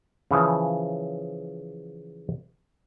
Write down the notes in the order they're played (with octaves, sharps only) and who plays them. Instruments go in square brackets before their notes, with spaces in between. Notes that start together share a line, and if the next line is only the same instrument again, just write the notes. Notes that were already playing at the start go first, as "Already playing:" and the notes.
[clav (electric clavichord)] C#3 E3 F3